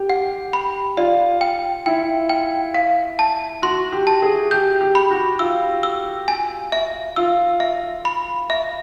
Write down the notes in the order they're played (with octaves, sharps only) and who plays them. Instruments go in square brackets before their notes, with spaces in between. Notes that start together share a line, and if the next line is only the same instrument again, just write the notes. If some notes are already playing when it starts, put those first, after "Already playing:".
Already playing: [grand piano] G4
[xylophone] F#5
B5
[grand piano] F4 [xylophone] D5
[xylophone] G5
[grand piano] E4 [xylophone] G5
[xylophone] G5
F5
A5
[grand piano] F#4 [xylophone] C6
[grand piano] G4
[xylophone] A5
[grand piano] G#4
[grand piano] G4 [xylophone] G6
[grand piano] G4
[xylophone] B5
[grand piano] F#4
[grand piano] F4 [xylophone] E6
[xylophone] E6
G#5
E5
[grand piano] F4 [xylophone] E6
[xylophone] E5
B5
E5